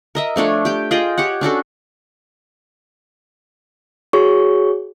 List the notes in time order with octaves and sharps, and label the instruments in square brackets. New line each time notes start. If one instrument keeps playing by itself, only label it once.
[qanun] A#4 D#5 E5
F3 A3 D4 C#5
G4 G5
F4 G#4 D#5 G5
G4 C#5 F#5
C#4 D4 F#4 A4
[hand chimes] F#4 G#4 C#5 C#6